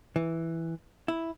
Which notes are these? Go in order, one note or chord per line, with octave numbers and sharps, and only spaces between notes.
E3
E4